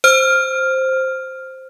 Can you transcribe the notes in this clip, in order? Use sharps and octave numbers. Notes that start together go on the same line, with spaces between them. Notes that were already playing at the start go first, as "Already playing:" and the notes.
C5 F6